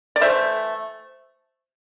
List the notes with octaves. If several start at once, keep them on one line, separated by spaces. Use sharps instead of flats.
D5
E3 A3 C5 E5